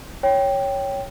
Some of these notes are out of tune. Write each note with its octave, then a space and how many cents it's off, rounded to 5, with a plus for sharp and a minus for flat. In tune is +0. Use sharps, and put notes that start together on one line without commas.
C#5 +0 G5 +0